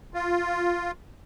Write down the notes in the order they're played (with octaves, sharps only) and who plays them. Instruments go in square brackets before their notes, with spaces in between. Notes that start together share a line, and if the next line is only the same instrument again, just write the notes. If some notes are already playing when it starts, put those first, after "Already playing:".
[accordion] F4